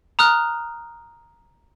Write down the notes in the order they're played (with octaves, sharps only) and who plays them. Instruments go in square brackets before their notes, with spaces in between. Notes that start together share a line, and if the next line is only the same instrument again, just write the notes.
[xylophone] A#5 D#6 F6 F#6